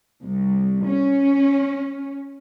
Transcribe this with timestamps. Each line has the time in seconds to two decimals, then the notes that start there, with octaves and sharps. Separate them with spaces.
0.22 C2
0.86 C#4